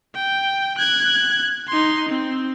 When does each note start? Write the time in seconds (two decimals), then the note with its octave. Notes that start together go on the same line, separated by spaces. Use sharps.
0.15 G5
0.78 F#6 G#6
1.69 D#4 C6
2.10 C4